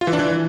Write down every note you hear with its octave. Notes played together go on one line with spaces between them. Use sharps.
F4
E3
D4
E3